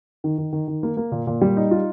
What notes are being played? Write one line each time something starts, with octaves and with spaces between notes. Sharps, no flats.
D#3
D#3
D#3
D#3
A#3
A#3
A#2
A#2
G3
D#4
F4